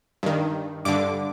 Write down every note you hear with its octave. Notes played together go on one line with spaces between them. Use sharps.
G2 D#3
G2 D3 D6